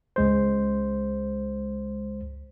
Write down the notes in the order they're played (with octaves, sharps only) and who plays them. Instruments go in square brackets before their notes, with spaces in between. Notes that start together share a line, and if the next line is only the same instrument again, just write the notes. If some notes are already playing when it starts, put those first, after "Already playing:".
[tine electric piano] C#2 G#3 C5